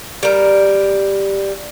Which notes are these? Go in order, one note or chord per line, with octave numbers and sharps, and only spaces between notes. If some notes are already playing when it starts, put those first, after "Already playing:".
G3 A#4